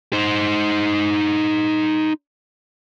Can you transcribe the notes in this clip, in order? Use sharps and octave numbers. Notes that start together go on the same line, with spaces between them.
D#4 C5